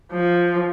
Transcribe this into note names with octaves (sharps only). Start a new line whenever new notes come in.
F3